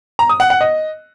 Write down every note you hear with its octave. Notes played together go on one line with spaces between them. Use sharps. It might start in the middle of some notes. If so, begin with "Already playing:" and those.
A#5
D#6
F#5
F#5
D#5